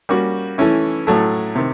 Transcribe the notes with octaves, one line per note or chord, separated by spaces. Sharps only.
G3 A#3 C#4 F#4
E3 A3 C#4 E4
A2 F#3 A3
C3 D#3